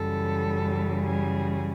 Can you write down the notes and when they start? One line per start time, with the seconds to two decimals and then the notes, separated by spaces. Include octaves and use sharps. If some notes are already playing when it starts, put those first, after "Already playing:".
Already playing: F#2 C#3 E3 G3 A4
1.05 G#4